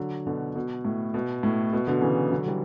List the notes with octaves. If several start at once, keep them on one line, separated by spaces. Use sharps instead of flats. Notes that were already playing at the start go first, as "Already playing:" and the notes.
Already playing: D3 F#3
B2 D3
B2
A2
B2
A2
B2
B2 D3
C#3 E3
D3 F#3
E3 G3